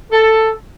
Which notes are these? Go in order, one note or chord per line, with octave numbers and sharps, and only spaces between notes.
A4